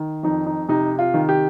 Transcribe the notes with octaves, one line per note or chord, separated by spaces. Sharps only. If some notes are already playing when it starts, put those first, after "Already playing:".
Already playing: D#3
F2 D#4
D#4
C3 D#4
F4
D#3
G4